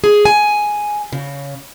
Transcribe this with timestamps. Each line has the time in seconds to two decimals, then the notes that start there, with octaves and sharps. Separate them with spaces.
0.04 G#4
0.25 G#5
1.12 C#3